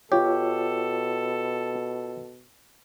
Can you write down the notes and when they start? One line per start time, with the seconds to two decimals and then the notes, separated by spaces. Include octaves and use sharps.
0.12 B2 F4 G4 A4 C#5